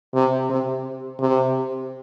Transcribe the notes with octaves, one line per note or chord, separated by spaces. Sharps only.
C3
C3
C3